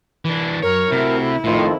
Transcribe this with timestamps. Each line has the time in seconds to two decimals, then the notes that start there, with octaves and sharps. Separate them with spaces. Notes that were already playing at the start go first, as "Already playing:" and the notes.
0.25 E3 D4
0.62 F#2 A#4 C#5
0.92 C3 A3 E4 F#4
1.44 F2 A2 D#3 F4